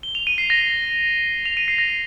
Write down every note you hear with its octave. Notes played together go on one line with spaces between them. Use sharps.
G7
F7
D#7
C7
A#6
F7
D#7
C7
A#6